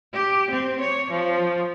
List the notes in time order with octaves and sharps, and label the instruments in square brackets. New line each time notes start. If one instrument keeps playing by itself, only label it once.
[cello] G4
C4
C#5
F3